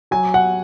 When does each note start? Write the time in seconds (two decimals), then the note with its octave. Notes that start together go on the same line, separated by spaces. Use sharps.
0.11 F#3 G#5
0.34 F#5